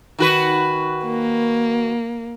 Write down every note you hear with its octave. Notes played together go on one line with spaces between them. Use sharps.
D#3 F#4 B4
A#3